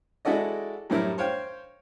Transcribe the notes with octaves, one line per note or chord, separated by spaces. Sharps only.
G#3 E4 F#4 A4 D5 D#5
F#2 A2 G3 E4 A#4
C5 C#5 F5 G5